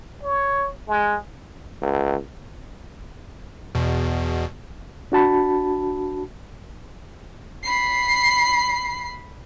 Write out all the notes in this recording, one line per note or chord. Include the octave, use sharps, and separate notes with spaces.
C#5
G#3
C#2
E2 B2
D4 F#4 A5 B5
B5 C7